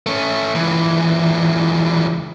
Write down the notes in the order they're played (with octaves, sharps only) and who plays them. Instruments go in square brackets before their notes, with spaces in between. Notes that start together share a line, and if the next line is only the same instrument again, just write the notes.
[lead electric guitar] A3 C#4
C#2 E3